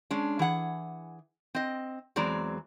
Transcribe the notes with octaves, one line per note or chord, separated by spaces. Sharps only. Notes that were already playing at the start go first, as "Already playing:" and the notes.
G#3 C#4 D4
E3 G#4 F#5
C4 D#5
E2 F#3 G#3 C4 D5 A#5